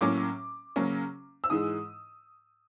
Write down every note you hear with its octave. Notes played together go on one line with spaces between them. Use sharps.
A2 F#3 A#3 C#4 D6
C#3 F#3 A#3 C#4
E6
G#2 E3 G#3 D#6